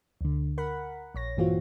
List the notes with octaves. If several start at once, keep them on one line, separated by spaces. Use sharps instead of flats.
D2 D3
A#4 F#5 B5
A#1 C#5 A#6
G2 A#2 E3 C4 F4 F#4